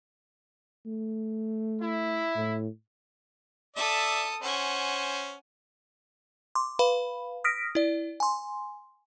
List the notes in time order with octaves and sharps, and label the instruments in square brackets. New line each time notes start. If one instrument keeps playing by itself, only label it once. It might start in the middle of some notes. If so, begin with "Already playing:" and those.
[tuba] A3
[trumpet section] E4
[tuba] A2
[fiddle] A4 D#6 [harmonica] D5 E5
[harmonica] C#4 C5 [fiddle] F#5 G#5
[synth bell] C6 D6
B4 F5 B5
D#6 F6 A#6 B6 D7
E4 D5
G#5 C6